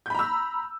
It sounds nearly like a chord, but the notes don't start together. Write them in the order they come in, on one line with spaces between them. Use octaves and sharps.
G6 B5 A#5 E6